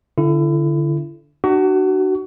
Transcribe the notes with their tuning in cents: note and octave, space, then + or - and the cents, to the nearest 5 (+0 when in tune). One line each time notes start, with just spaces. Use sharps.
D3 -10 E4 +30
D4 +40 F#4 +25